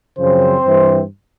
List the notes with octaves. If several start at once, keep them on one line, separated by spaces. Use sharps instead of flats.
F#2 C#3 F3 C4 C5
G2 E3